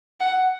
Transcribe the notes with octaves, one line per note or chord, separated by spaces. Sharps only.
F#5